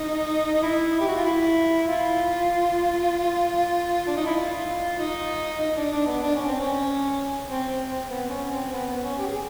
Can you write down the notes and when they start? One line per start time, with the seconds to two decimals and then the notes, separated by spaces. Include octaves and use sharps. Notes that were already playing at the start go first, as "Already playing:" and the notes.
Already playing: D#4
0.54 D#4
0.62 E4
1.00 G4
1.08 F#4
1.16 F4
1.25 E4
1.87 F4
4.07 D4
4.17 D#4
4.26 E4
4.36 F4
4.99 D#4
5.60 D#4
5.77 D4
5.92 D4
6.07 B3
6.22 D4
6.35 C#4
6.47 C4
6.60 C#4
7.47 C4
7.88 C4
8.09 B3
8.30 C#4
8.51 C4
8.72 B3
8.87 B3
9.03 C#4
9.18 G4
9.27 G#4